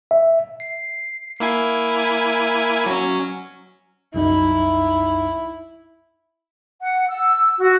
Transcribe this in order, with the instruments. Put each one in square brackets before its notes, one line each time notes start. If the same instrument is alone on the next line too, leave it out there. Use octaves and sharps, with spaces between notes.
[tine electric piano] E5
[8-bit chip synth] C7
A#3 E4 G#5
F#3 C#4
[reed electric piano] C2 F#2 D#4 [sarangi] E4
[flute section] F#5
E6
F#4